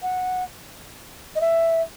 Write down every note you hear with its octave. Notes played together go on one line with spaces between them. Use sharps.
F#5
D#5
E5